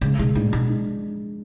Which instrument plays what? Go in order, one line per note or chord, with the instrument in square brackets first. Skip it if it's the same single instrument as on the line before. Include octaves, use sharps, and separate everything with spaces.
[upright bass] C#3 [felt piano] G#3
[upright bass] B2 [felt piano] G#3
[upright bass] A2 [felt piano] D4
[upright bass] B2 [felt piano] G#3
[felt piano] D4